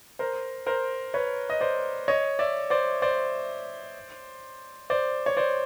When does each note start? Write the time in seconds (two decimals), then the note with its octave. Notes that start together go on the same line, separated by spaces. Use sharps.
0.19 A#4 C5
0.66 A#4 C5
1.14 B4 C#5
1.50 D#5
1.61 C5 D5
2.08 C#5 D#5
2.39 D5 E5
2.70 C5 D5
3.02 C5 D5
4.90 C5 D5
5.26 C#5
5.37 C5 D5